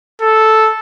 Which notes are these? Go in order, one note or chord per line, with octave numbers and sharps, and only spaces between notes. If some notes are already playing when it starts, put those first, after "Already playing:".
A4